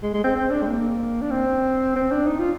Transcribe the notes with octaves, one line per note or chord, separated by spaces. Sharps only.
G#3
G#3
C4
C4
D4
G#3
A#3
D4
C4
C4
D4
D#4
F4